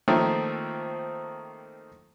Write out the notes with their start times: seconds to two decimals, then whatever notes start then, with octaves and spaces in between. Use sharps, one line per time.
0.08 D#3 F3 A3 A#3 C4